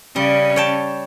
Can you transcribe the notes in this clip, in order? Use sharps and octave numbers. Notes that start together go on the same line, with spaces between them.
C#3 G3 C#4
C#5 G5 A5